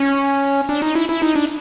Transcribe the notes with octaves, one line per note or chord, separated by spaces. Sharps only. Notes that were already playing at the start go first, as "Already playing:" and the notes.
Already playing: C#4
D4
D#4
E4
E4
D#4
D4